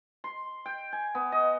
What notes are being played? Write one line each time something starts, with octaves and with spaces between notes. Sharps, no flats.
C6
G5
G#5
B3
D#5